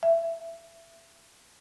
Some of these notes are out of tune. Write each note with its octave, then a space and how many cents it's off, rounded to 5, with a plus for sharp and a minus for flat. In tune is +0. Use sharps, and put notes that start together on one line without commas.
E5 +20